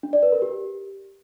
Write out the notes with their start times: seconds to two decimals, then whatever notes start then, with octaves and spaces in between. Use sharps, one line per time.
0.03 D4
0.13 D5
0.23 B4
0.32 A#4
0.42 G4